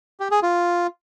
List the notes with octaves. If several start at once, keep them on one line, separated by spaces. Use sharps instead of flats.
G4
G#4
F4